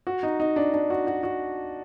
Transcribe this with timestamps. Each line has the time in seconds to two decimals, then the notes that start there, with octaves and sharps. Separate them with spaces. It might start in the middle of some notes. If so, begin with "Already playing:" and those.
0.07 F#4
0.23 D#4
0.40 D#4
0.56 D4
0.73 D4
0.90 F#4
1.07 F#4
1.23 F#4